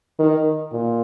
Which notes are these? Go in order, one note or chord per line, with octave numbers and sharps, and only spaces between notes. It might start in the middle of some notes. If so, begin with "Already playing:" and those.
D#3
A#2